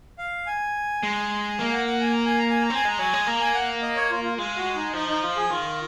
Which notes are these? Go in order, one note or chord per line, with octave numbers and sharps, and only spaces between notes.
F5
G#5
G#3
A#3 A#5
G#5
F#5
F#5
G#5
A#5
G#5
A#5
G#5
A#5
C4 G#5
G#3 A#5
F#3 G#5
G#3
A#3 A#5
G#5
F#5
D#5
C#5
F4
F4
G#3 F4
F#4
D#4
F3 D#4
D#4
F4
G#4
D#3 F4